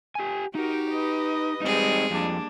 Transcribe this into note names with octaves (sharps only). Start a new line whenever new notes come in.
G4 G#5
D#4 F#4 G4 A#4
B4 D#5
G3 G#3 C4 D#4 G#4
F2 A#3 D4